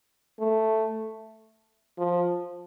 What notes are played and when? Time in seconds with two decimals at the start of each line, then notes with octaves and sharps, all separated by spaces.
0.39 A3
1.98 F3